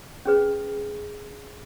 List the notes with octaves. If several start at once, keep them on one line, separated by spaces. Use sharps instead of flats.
C#4 G#4 B4